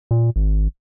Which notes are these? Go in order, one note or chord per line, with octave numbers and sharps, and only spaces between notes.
A#2
G#1